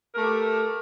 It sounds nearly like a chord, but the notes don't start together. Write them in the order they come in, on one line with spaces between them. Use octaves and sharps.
A#4 A3 A4 G4